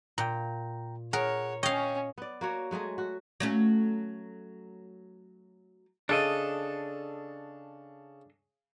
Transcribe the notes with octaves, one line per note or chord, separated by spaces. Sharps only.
A#2 G5 A#5
G#4 A#4 C#5 F#5
C#4 C#5 D#5 F5 G5
B3 D5
A#3 F#4 C#5
F#3 G#3 A3 G#4
F#4
F#3 A3 C#4
C#3 D4 A4 D#5